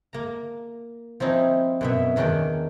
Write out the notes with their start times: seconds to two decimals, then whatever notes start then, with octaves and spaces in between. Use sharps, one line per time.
0.13 A#3 A#5
1.20 F3 C4 C#4 D#4 E4
1.81 F#2 B2 E5
2.16 E2 D#3 C#4 D4 D5